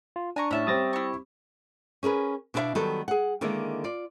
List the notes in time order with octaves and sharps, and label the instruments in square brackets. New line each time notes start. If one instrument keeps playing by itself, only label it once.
[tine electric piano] F4
[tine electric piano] D4 [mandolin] G#5 A#5 C#6
[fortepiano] A2 [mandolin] C#4 E5 A5
[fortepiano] G3 C4 G4 [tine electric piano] D#6 A6 A#6
[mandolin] E4 C#6
[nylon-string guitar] C#4 G#4 A#4 B4
B2 D4 E4 C5 E5 F5
D#3 F#3 G3 B3 A4
G#4 F#5
D3 D#3 G#3 A#3 E4
F4 D5